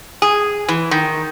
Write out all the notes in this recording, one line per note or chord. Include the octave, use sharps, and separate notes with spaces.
G#4
E3
D#3